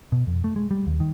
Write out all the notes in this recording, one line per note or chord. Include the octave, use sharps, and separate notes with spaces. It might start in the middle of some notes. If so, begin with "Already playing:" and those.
B2
F2
A3
G#3
G3
D#2
D#3